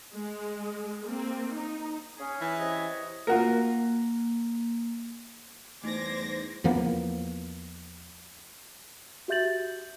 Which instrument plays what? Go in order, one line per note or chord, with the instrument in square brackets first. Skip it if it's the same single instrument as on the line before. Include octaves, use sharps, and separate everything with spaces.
[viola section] G#3
A#3 C4
D#4
[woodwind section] C#4 G#4
[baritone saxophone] E3
[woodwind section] C3 C#5 D#5
[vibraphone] A#3 [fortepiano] F4 F#4 A#4
[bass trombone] E2 [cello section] G3 C5 [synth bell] A3 D#4 [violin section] D6 G#6 A#6
[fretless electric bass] E2 F3 A#3 B3
[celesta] F#4 G4 E5 G6 A6 F#7